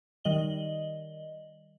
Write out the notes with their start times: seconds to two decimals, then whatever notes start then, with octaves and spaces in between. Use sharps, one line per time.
0.24 D#3 G3 D#5 F#7 G7